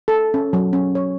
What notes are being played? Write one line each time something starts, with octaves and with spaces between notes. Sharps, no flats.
A4
C#4
F#3
C#4
C#5